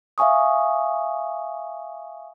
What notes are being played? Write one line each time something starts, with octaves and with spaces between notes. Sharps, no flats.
E5 F5 G#5 C#6 D#6